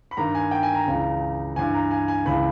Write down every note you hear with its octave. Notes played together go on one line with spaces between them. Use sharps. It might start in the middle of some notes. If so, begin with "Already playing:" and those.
B5
G2 D#3 A#5
G#5
G5
G#5
A#5
C#2 C#3 E3
G2 E3 G#5
A#5
G#5
G#5
C#2 C#3 E3 B5